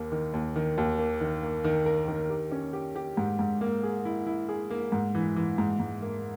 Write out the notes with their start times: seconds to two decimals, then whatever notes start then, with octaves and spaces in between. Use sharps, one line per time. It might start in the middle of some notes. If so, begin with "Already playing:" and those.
Already playing: D#2 A#3
0.12 D#3
0.33 D#2
0.56 D#3
0.78 D#2
0.99 A#3
1.21 D#3
1.43 A#3
1.64 D#3
1.86 A#4
2.08 D#3
2.30 G4
2.52 C#4
2.73 G4
2.96 G4
3.17 G#2
3.39 G#2
3.61 A#3
3.83 G#4
4.05 E4
4.27 E4
4.49 G#4
4.70 A#3
4.92 G#2
5.15 E3
5.36 E3
5.58 G#2
5.80 G#2
6.02 A#3